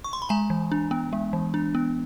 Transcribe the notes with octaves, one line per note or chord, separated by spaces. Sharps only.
C#6
C6
B5
G#3 G#5 A#5
E3
D4
B3
G#3
E3
D4
B3